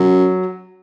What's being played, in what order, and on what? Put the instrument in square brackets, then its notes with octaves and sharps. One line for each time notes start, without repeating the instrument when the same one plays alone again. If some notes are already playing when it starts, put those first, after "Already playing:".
Already playing: [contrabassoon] F#2 [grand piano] F#3